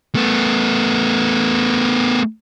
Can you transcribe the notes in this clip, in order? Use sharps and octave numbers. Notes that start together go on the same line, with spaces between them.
A3 B3